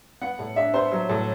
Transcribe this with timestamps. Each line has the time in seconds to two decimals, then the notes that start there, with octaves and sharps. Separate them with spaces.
0.21 B3 F#5
0.39 A2
0.56 D4 E5
0.74 B3 C5
0.92 F#3
1.09 A2